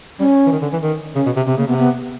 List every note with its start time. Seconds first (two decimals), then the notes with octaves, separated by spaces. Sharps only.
0.20 G3 C#4
0.47 E3
0.52 D#3
0.62 D3
0.73 E3
0.83 D#3
1.15 C#3 C#4
1.26 B2
1.36 C3
1.47 C3 C4
1.57 C#3 A#3
1.67 C3 B3
1.79 B3